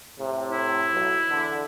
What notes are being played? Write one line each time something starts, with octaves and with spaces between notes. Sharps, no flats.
A2 C3
E4
B1
E2 D3